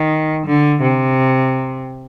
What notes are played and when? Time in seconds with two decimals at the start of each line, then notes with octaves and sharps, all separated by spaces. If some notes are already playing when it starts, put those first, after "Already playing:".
Already playing: D#3
0.46 D3
0.82 C3